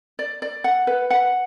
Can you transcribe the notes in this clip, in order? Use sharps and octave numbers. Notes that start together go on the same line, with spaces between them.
D5
D5
F#5
B4
F#5